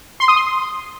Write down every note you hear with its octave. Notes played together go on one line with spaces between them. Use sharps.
C6
D#6
C6